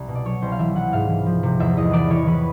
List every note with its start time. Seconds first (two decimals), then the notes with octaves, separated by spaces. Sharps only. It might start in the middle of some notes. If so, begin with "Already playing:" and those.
Already playing: C2
0.08 B2
0.15 D5
0.25 F#3 C#5
0.42 C2 C5
0.52 F5
0.59 E3 E5
0.75 E3 F#5
0.93 G#2 F5
1.09 E3
1.26 F3
1.43 C3
1.59 E2 E5
1.77 E2 D#5
1.93 E3 D5
2.10 E3 C#5
2.27 E3 B4